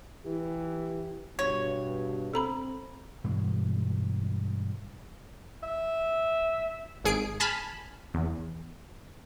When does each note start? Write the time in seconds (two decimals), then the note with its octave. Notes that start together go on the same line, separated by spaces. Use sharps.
0.26 E3 G4
1.39 G2 B2 C#5
2.34 C4 A4 A#5 B5
3.24 G2 B2 E3 G#3
5.63 E5
7.04 G#1 G#2 G#4 C7 D7
7.40 G#5 A5 B5 F6
8.14 E2